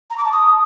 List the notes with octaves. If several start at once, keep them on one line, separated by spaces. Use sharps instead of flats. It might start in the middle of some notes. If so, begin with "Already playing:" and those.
A#5
D6
A5
D#6